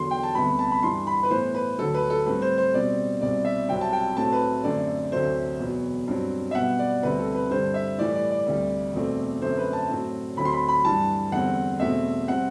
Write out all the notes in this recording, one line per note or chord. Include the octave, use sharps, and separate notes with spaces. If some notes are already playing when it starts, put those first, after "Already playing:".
Already playing: E2 D3 F#3 C6
G5
A5
D2 C3 G3 B3 B5
A5
B5
G2 E3 G3 C6
B5
B4
A2 E3 B3 C5
B4
D2 D3 F#3 A4
B4
A4
A2 G3 C4 B4
C5
C5
B2 G3 C4 D5
C2 B2 G3 C4 D5
E5
C2 C3 F#3 C4 G5
A5
G5
A2 F#3 A3 C4 A5
B4
F#2 D3 A3 C4 D5
D2 C3 F#3 A3 C5
E2 B2 F#3 B3
G2 F#3 C4
E5
B2 G3 B3 F#5
D5
D2 C3 G3 C4 B4
A4
B4
G2 D3 G3 C5
E5
A2 E3 G3 D5
D5
D5
D2 C3 G3
E2 B2 A3 C4
F#2 D3 A3 C4 C5
B4
A5
A2 F#3 C4
D2 D3 F#3 C4 B5
C6
B5
B5
G2 E3 G3 A5
E2 D3 G3 C4 F#5
E2 B2 A3 C4 E5
C3 G3 C4 F#5